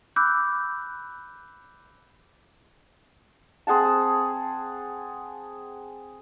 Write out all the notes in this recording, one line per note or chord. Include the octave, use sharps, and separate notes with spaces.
B5 D6 E6 F#6 G6
C4 G#4 F#5 A5